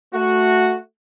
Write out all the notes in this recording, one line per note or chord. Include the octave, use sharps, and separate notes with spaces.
A3 F#4